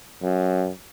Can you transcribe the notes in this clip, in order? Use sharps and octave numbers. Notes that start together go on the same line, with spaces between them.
F#2